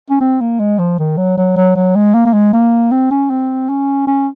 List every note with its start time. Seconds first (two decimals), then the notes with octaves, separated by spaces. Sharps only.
0.10 C#4
0.21 C4
0.40 A#3
0.60 G#3
0.79 F3
0.99 D#3
1.17 F#3
1.38 F#3
1.57 F#3
1.76 F#3
1.95 G#3
2.14 A#3
2.26 A#3
2.33 G#3
2.53 A#3
2.92 C4
3.11 C#4
3.30 C4
3.69 C#4
4.07 C#4